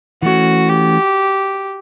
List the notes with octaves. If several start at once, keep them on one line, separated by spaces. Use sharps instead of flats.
E3 A3 C#4 F#4
G4